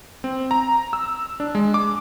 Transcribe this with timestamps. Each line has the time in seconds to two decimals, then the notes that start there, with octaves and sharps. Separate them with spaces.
0.24 C4
0.51 A#5
0.93 E6
1.40 D4
1.55 G#3
1.74 D6